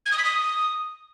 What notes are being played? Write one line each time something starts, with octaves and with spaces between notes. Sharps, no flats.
G#6
D#6
B6
D#6